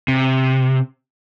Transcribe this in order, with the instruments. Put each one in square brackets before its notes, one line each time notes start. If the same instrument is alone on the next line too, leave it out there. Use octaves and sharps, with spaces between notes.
[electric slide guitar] C3